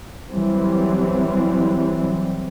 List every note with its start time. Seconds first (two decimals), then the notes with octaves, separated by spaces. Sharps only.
0.32 E3 F#3 G3 C4